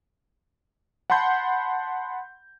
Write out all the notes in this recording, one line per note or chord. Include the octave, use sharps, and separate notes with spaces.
F#5 A5 B5 C6 G6